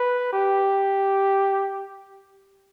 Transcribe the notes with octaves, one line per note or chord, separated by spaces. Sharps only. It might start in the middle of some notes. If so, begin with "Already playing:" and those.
Already playing: B4
G4